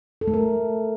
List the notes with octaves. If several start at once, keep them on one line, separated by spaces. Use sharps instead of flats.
A4
A3
A#4